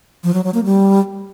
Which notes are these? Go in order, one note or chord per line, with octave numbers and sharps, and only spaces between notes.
F3
F#3
F#3
A#3
G3